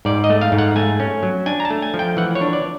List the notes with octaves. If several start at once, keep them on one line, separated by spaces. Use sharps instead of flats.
G#2 D5
D#5
A3
F5
G#2
F#5
A3 G#5
C#4
F#3
D4 G#5
A#5
A5
A3
G#5
F3
G5
E3 F#5
C#5
D4
D5